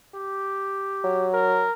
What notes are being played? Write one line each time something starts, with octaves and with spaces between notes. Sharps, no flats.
G4
F#3
A#4